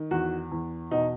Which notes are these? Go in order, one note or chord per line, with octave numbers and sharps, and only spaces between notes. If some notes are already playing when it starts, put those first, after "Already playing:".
Already playing: D#3
E2 F#4
E2
B2 D#4